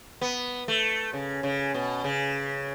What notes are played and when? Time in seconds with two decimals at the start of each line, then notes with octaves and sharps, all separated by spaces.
0.21 B3
0.68 A3
1.13 C#3
1.43 C#3
1.74 B2
2.04 C#3